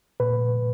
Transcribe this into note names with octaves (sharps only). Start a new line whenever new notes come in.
A#2 B4